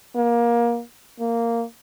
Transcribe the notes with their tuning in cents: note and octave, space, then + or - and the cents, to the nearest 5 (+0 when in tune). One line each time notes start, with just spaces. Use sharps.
A#3 +20
A#3 -10